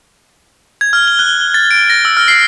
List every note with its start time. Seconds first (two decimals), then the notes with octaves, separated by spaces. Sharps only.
0.81 G#6
0.93 F6
1.08 G7
1.19 F#6
1.54 A6
1.71 D7
1.90 A#6
2.05 E6
2.17 F6
2.28 C7